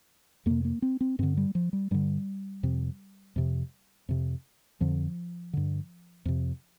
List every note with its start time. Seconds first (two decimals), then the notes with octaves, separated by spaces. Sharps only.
0.46 F2 C3 A#3
0.65 A#3
0.82 C4
1.01 C4
1.19 G2 D3 C4
1.37 G3
1.55 F3
1.73 G3
1.91 G2 D3 G3
2.63 F2 C3
3.36 F2 C3
4.09 F2 C3
4.81 F2 D3 F3
5.53 G2 D3
6.25 F2 C3